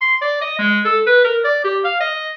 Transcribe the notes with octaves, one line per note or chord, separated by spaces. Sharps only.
C6
D5
D#5
G#3
A4
B4
A#4
D5
G4
F5
D#5